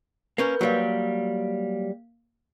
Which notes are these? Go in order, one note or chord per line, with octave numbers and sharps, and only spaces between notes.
A#3 C#4 A#4 B4 G6
F#3 G3 A#3 F5